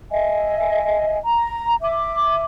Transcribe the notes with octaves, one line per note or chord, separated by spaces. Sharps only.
D#5 E5 G#5
A#5
E5 D6